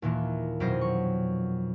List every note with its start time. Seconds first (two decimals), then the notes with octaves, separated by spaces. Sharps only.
0.02 D#2 A#2 E3 A#3
0.60 F2 B2 F#3 C4 C5 D#5
0.81 C#6